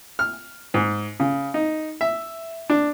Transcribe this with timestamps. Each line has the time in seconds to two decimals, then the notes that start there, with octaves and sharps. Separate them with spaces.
0.19 F6
0.74 G#2
1.20 C#3
1.54 D#4
2.01 E5
2.70 D4